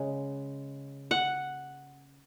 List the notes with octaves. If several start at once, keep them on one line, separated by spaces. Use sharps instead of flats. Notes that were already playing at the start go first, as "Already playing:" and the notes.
Already playing: C#3 G#3
F#5